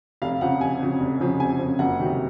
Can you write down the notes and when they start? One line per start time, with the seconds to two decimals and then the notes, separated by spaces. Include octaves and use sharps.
0.22 F1 F5
0.41 F2 C#3 F3 F#5
0.60 F1 G#5
0.80 F2 C#3 F3
1.00 F1
1.20 F2 C#3 F3
1.40 F1 G#5
1.59 F2 C#3 F3
1.79 F#1 F#5
1.99 F2 C3 D#3 F#3